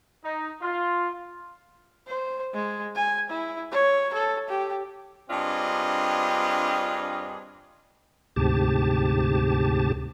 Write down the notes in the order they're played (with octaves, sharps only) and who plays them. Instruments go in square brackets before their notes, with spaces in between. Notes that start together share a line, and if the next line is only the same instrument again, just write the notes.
[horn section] D#4
F4
[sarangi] C5
G#3
G#5
E4
C#5
A4
G4
[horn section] G2 C4 D4 F4 G#4 D#5
[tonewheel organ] D2 G#2 C3 G4 A5